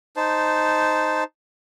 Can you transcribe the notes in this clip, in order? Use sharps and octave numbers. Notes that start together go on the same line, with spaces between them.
D#4 C5 A5